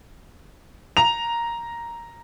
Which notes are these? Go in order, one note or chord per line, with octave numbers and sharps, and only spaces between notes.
A#5 F7